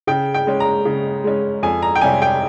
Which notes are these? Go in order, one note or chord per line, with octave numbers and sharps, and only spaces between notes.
C#3 G5
G5
G#3 C#4
A#5
C#3
G#3 C#4
F2 G#5
A#5
G5
C3 G3 C#4 G#5
G5